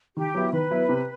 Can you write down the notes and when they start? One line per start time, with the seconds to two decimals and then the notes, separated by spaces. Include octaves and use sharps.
0.17 D#3 G4
0.35 F#3 B3 E4
0.52 D#3 B4
0.71 F#3 B3 E4
0.89 C3